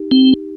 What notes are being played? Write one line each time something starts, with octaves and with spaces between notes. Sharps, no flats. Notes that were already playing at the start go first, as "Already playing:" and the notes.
Already playing: D#4 G4
C4